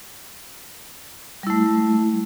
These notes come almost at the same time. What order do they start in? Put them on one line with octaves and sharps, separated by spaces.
G3 E4 A3